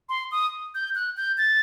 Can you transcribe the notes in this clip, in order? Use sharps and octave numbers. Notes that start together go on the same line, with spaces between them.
C6
D#6
G6
F#6
G6
A6